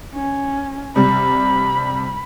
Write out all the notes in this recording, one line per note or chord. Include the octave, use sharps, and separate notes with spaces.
C#4
C3 G3 B5